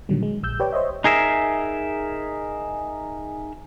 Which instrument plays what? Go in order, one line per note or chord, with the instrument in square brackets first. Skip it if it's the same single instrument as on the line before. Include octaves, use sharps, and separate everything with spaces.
[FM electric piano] A#2 D3 D#3 F#3 G3
G#3
A#1 E6 G6
G4 B4 C#5 D5 G5
C5 C#5 D#5 E5
[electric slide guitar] D#4 G#4 A#4 E5